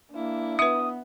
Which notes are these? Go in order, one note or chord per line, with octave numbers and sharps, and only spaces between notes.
A#3 D4 E4
B3 B4 E5 D#6